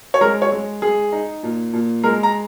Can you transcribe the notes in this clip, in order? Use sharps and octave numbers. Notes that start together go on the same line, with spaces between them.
C#5
G#3 A#4
C#5
G#3
G#3 G#4
D#4
A#2
A#2
G#3 A#4
A#5